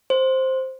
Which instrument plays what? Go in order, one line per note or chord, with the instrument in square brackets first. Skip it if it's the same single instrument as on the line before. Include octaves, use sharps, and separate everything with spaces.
[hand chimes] C5